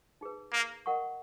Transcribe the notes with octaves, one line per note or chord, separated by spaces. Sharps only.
D#4 G#4 B4
A#3
A#4 D#5 F#5 C#6